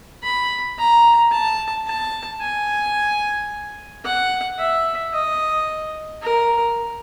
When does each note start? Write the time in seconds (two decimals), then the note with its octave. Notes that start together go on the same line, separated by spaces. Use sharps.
0.23 B5
0.78 A#5
1.32 A5
1.87 A5
2.41 G#5
4.05 F#5
4.59 E5
5.14 D#5
6.22 A#4